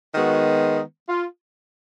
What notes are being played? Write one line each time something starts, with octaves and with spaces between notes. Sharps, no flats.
D#3 G#3 B3 F#4
F4